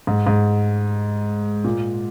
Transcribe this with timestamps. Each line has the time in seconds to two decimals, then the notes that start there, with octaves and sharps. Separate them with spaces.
0.07 G#2
0.27 G#2
1.64 A#2